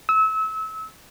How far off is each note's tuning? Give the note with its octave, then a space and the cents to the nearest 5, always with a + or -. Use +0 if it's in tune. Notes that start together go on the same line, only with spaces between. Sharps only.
E6 -30